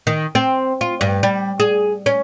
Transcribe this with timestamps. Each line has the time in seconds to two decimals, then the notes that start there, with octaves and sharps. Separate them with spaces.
0.07 D#3
0.35 C4
0.81 F4
1.01 G2
1.23 G3
1.60 G#4
2.06 C#4